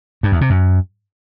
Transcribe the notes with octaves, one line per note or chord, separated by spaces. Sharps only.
G2
E2
C3
F#2